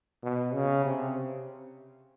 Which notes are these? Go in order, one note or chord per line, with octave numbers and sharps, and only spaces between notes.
B2
C#3
C3